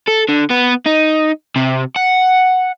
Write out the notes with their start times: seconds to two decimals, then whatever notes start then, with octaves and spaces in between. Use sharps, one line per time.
0.08 A4
0.29 D3
0.50 B3
0.86 D#4
1.56 C3
1.96 F#5